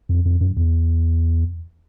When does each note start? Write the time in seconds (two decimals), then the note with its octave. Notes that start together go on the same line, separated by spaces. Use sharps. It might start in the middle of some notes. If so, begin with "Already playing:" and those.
0.09 F2
0.25 F2
0.41 F#2
0.57 E2